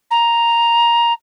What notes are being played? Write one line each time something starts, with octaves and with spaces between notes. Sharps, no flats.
A#5